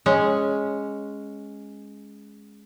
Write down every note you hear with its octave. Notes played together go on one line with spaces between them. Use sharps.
G#3 C#4